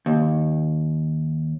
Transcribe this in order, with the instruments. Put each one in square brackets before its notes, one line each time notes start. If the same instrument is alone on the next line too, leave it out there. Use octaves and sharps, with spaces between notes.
[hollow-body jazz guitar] D#2